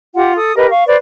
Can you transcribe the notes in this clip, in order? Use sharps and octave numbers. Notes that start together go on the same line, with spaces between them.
F4 G4 F#5
A4 D#6
G4 A#4 B4 D#5
F5 C#6
B4 C5 D5